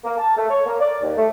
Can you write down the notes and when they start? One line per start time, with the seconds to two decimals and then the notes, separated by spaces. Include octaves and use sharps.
0.04 A#3
0.18 A5
0.37 A3
0.50 C#5
0.66 A#3
0.80 D5
1.02 D#2
1.16 A3